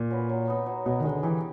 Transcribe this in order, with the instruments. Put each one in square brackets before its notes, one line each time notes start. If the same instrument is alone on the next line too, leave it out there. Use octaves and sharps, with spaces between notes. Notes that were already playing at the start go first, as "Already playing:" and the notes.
Already playing: [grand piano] A#2
[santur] C#4 F#4 B4
F#3
B3 D#4
F#3
[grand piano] B2 [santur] B3 D#4
[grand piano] D#3
[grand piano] D3 [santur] G#3
[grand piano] E3 [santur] C4 D#4 G4